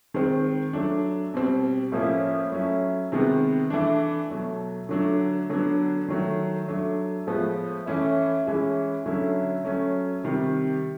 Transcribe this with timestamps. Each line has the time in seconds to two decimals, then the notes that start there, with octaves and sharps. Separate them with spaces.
0.14 D#3 G#3 C4
0.73 F#3 A3 D4
1.34 B2 G3 C4
1.92 A2 F3 A#3 C#4 E4
2.52 F#3 A3 C#4 E4
3.12 C3 D#3 G#3 B3
3.70 E3 A3 D4
4.30 B2 F#3 A3
4.89 D3 F#3 A3 D4
5.50 D3 F#3 B3 D4
6.08 D#3 F#3 A3
6.68 F#3 A3 D4
7.27 A2 F3 G#3 B3
7.86 E3 A3 C#4 E4
8.46 E3 G#3 C#4 E4
9.06 D3 F#3 A3 C#4 E4
9.65 F#3 A3 C#4
10.24 C3 D#3 G3